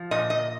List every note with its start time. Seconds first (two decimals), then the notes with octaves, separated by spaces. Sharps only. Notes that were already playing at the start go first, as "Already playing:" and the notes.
Already playing: F3
0.11 A#2 D#5
0.30 D#5